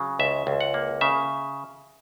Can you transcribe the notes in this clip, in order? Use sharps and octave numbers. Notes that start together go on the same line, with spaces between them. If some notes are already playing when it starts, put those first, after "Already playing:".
Already playing: C#3 F#3
C#2 E5
C#2
F#5
A#3
C#3 E5